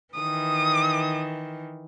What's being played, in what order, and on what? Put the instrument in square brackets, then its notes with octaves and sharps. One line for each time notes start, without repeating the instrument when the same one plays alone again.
[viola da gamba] D#3 E3 [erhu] D#6